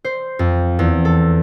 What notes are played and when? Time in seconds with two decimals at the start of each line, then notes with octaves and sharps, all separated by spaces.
0.04 C5
0.39 F2
0.79 E2
1.05 A4